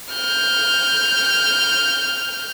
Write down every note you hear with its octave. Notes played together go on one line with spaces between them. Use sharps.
F6 G6